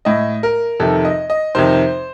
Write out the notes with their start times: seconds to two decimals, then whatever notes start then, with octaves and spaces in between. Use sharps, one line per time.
0.05 A2 D#5
0.43 A#4
0.80 F2 C3 D#3 A4
1.05 D#5
1.30 D#5
1.55 F2 C3 D#3 C5